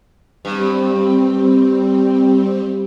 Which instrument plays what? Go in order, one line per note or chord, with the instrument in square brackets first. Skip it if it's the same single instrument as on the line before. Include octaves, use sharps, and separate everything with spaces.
[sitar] G2 [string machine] G3 C4